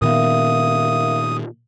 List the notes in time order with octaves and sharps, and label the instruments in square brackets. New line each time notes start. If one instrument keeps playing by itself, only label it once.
[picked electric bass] A#2 D#3 B3 [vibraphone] A#4 E5 F5 [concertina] D#6